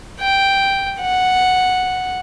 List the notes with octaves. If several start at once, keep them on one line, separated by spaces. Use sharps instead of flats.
G5
F#5